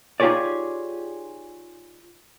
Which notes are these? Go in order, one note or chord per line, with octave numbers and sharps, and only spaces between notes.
D#4 F4 G4 G#4 C#5 D5